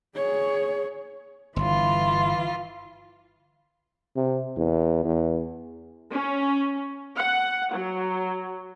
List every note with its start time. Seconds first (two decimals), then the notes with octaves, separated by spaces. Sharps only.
0.15 G#4 C#5
1.56 G1 E3 F4 C6
4.16 C3
4.57 E2
5.04 E2
6.11 C#4
7.17 F#5
7.74 F#3